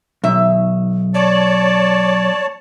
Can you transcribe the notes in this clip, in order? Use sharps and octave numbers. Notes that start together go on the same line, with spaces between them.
B1 D#3 E5
C#5 D5 A5